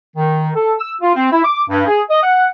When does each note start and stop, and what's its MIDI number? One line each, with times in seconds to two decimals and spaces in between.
0.17 0.50 51
0.55 0.74 69
0.79 0.93 88
1.01 1.12 65
1.15 1.29 60
1.32 1.43 64
1.44 1.61 86
1.70 1.85 43
1.86 2.02 68
2.10 2.20 75
2.23 2.47 78